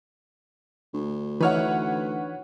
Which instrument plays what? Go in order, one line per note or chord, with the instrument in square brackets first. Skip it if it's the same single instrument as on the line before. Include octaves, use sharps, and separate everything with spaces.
[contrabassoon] D2
[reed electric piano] E3 D#4 F6 [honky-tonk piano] B4 C#5 F#5